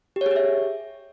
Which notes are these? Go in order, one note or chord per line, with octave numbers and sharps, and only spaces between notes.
G4
C#5
G#4
G4
E5